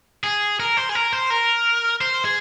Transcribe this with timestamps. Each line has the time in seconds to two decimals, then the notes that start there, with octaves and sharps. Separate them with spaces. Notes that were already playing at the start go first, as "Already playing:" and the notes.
0.24 G#4
0.60 A#4
0.77 C5
0.89 G#4
0.95 A#4
1.12 C5
1.30 A#4
2.01 C5
2.25 G#4